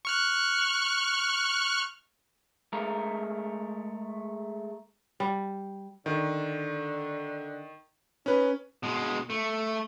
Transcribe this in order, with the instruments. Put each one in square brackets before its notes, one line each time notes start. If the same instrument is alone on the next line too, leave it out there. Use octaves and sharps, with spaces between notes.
[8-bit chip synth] C#6 F6 F#6
[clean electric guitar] G#3 A3 A#4
[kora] G3
[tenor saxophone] D3 [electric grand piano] D#3
[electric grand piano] C#4 B4 [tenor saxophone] D#4
[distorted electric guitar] B2 G#3
A3